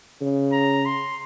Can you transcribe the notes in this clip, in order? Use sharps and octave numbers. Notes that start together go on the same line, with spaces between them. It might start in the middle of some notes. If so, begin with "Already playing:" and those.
C#3
A#5
C6